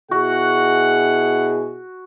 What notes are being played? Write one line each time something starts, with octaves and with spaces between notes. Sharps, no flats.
B2 E4 F#4 G#4 F#5